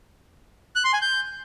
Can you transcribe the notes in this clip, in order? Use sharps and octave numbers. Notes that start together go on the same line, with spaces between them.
F#6
C6
G#5
G6